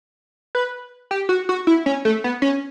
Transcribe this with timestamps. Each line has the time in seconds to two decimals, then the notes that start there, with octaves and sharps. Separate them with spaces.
0.55 B4
1.11 G4
1.29 F#4
1.49 F#4
1.67 E4
1.86 C#4
2.05 A3
2.24 B3
2.42 C#4